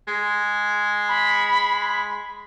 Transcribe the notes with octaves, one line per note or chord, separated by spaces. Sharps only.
G#3
B5